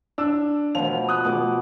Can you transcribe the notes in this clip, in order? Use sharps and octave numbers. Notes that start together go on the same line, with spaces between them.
D4 E6
B2 F3 F7
D#6 F#6
B2 D6